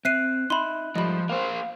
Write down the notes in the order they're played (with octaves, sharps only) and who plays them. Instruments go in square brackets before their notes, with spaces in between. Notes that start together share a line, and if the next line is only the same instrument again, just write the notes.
[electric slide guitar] C4 [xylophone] E5 C7 D#7 [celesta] F#6
[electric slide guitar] D#4 E5 [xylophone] B5 C6
[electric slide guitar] G#2 G3 A3 [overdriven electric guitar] F3 [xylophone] D#5 B5
[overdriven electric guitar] A#3 C5 [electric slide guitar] F5